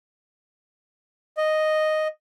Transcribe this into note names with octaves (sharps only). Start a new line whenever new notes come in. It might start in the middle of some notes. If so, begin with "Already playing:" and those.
D#5